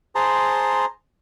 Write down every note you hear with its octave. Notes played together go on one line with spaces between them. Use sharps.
G#4 C5 A5 A#5 C6